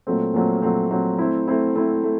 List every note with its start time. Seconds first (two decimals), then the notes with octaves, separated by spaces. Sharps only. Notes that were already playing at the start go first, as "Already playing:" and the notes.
0.07 A#2 F#3 A3 C4
0.34 A#2 F#3 A3 C4
0.62 A#2 F#3 A3 C4
0.91 A#2 F#3 A3 C4
1.19 A3 C4 E4
1.48 A3 C4 E4
1.75 A3 C4 E4
2.03 A3